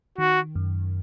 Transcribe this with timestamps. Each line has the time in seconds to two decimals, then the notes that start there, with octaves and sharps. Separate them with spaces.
0.18 D#3 F#4
0.55 F#2